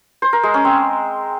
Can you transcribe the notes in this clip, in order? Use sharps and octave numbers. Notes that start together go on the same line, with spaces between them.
C5
A#4
G#3
C#4
C4